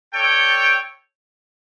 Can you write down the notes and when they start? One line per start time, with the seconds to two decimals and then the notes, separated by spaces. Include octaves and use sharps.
0.13 D4 A4 C#5 G5